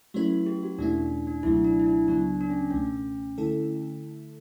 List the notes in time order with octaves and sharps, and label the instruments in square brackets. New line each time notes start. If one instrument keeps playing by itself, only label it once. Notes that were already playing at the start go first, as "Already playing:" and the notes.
[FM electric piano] F#3 A3 C#4 E4 B4 [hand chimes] F#4
[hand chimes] G4
F#4
[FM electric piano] E2 B2 A3 C#4 E4 [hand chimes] D4
[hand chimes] D4
D4
[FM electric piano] C#2 B2 F#3 A3 [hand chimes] E4
[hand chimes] D4
E4
D4
[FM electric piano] C#2 C#3 F#3 B3 [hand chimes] D4
[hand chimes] D4
C#4
[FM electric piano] C#2 B2 A3 [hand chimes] C#4
[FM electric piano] D3 A3 E4 A4